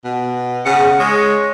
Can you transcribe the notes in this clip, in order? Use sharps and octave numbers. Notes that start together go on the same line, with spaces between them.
B2
C#3 F#5
G#3 C#5